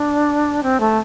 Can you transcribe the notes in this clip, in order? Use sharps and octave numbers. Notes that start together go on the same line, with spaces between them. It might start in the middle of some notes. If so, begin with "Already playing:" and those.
Already playing: D4
C4
A3